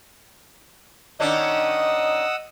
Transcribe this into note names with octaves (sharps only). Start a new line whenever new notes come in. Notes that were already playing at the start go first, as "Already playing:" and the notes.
D#3 C#4 D4 D#5 F#5 D#6 E6